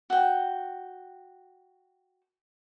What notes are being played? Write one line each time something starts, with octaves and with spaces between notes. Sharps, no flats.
F#4 G5